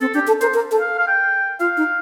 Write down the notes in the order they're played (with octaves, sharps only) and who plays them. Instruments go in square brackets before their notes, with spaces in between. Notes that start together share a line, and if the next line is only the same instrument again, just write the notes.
[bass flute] C4 [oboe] A4
[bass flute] D4 [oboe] G4
[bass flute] A4
[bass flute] A#4 [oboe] C5
[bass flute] A#4
A4
[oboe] F5
F5
G5
[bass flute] F4 [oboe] F5
[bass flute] D#4